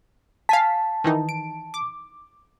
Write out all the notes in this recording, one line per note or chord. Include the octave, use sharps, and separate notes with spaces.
F5 G#5 A5 B6
D#3 E3 D#4
D7
D6